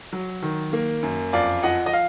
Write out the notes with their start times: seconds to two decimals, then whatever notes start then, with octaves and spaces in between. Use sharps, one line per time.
0.12 F#3
0.42 D#3
0.73 A#3
1.03 F#2
1.33 F2 D5 F5
1.63 F3 D#5 F#5
1.86 D#5
1.93 F5